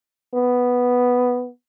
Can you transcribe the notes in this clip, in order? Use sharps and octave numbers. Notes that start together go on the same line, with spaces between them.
B3